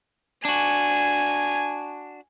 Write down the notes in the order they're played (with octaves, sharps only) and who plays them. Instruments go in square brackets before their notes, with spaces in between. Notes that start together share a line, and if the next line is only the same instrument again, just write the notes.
[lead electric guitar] D4 F#4 [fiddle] G#5